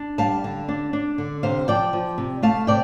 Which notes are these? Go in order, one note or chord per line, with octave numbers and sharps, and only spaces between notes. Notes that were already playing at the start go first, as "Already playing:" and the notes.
Already playing: D4
G3 F5 A5
D3
D4
D4
D3
C3 C5 F5
F3 D5 G5
F3
C3
A3 F5 A5
C3 D5 G5